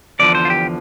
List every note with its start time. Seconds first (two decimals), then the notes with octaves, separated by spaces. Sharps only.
0.19 E2 D3 F3 D5
0.35 C5
0.45 F4
0.50 G4